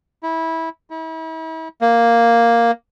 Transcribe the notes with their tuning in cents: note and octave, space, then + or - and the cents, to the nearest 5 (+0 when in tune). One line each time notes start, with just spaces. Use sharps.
E4 -20
E4 -40
A#3 +0